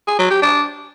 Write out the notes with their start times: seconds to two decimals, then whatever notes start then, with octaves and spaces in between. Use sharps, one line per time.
0.07 G#4
0.19 F#3
0.30 G4
0.42 D4